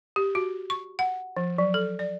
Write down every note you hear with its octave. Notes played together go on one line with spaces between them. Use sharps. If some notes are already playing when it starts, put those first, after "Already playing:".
G4
F#4
C#6
F#5
F3
F#3
A4
D5